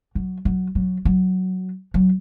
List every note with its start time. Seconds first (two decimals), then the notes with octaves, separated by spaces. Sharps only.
0.15 F#3
0.45 F#3
0.75 F#3
1.05 F#3
1.94 F#3